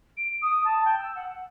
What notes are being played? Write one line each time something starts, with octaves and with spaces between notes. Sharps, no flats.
D7
D#6
A5
G5
E6
F#5